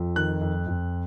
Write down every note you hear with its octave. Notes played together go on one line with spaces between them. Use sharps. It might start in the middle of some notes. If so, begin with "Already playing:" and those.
Already playing: F2 F3
D#3 F#6
F2
F2